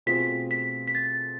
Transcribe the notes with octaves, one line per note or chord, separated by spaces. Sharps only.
B2 A3 C4 F4 G#4 B6
B6
B6
A6